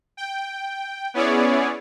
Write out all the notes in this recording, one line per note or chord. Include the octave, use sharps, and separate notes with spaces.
G5
B3 C#4 E4 G#4 C#5 D5